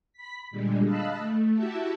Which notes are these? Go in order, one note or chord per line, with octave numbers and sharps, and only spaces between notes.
B5 B6
A#2 D3 G3 G#3
D#5 F5 A5 B5 E6 F#6
A3
E4 F#4 G4 E5 A5